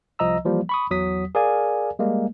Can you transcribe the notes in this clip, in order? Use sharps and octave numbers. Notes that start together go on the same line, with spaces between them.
C2 F3 D#5 A#5 E6
E3 F3 G3 A#3
B5 C#6 D#6
G#1 E2 F#3 D#6 B6
G#4 A#4 D5 F5 G#5
G3 G#3 A#3